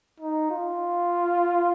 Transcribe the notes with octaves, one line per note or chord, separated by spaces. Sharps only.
D#4
F4